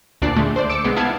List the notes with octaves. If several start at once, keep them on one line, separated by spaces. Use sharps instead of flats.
D2 A#2 D4 D5 F#6 C7
D3 G#3 A3
C5 D5
D6 E6 C#7 D7 E7
B1 G#3 B3 C7
B3 E4 F5 A5 G#6 C7